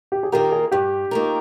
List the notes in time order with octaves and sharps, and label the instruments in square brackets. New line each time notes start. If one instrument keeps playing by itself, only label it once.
[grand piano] G4
G#4
[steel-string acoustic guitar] D#3 A#3 F4 A#4 [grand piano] G4
[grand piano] G#4
[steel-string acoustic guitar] G2 [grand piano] G4
[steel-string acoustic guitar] D#3 A#3 F4 A#4